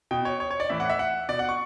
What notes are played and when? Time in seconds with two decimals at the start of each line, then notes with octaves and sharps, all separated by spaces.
0.11 B2 G5
0.25 C#5
0.40 C#5
0.51 C#5
0.60 D5
0.70 A2 E3 E5
0.80 F#5
0.89 E5
0.99 F#5
1.29 B2 D5
1.39 F#5
1.49 C#6